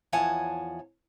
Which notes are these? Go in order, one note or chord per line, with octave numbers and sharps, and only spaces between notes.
E2 F3 C#5 F#5 G#5 A5